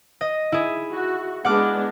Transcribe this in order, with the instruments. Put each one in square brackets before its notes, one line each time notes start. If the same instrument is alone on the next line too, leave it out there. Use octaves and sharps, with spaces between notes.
[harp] D#5
E4 G#4
[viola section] F#4
[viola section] G#3 B3 D4 [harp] F#5 D6 F6